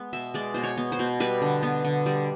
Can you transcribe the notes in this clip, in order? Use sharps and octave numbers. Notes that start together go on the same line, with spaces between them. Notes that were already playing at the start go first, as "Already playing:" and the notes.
Already playing: G#3 B3
B2 E5
G#3 D5
B2 C5
C#5
B3
C5
B2
G3 B4
D3
B3
D3
G3